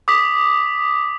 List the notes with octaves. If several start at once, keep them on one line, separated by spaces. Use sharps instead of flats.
D6 D#6 B6